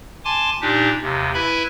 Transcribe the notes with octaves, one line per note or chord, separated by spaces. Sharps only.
G#5 A5 C6 D6
A#2 D4 D#4 G4
D#2 C3
E4 B4 E5 G#5 B5